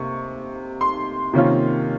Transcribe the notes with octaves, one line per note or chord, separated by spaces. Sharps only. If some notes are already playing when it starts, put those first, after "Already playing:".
Already playing: C3 A#3 C#6
C6
C3 D#3 A#3 C#4 F4